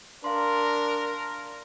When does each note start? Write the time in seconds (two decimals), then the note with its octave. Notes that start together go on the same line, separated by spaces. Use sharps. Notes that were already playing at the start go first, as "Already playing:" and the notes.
0.24 D4 A#4 F5 C6